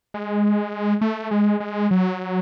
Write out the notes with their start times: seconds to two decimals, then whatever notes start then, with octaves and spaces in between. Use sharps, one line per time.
0.14 G#3
1.01 A3
1.31 G#3
1.60 G#3
1.91 F#3